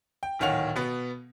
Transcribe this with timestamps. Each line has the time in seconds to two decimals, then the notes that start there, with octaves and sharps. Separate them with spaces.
0.23 G5
0.39 D1 A#2 D#3 C#5 F#5 F7
0.76 B2 B3